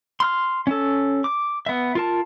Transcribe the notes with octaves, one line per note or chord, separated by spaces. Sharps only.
C6 F6
C#4 A4
D6
B3 E5
F4 A#4 A5